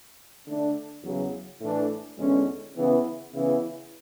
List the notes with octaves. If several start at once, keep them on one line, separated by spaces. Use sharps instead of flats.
D3 A3 D4
E2 C#3 F#3
A2 E3 A3 D4
E2 D3 G#3 C#4
C#3 E3 B3 E4
C#3 E3 B3 E4